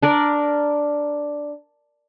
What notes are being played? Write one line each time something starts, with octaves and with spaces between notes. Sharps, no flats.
D4 A#4 D5